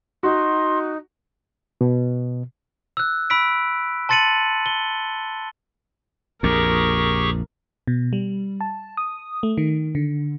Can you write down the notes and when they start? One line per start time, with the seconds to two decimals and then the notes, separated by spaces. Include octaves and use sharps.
0.23 D#4 F#4 C6
1.81 B2
2.97 E6 F#6
3.30 B5 E6 B6 D7
4.09 A5 C6 A6 C#7 D#7 F#7
4.66 G7
6.43 A#1 F2 G4 G#4 A#4 C#6
7.87 B2
8.13 G3
8.61 A5
8.97 D#6
9.43 A3
9.58 D#3
9.95 D3